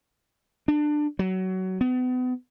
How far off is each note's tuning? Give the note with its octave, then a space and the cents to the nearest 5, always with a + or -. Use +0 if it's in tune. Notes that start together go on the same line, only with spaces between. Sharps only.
D4 +20
F#3 +20
B3 +35